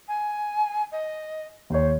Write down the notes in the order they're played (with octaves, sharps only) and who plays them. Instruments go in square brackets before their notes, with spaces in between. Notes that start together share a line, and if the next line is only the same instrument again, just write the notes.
[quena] G#5
D#5
[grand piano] D#2 C#5 [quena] C5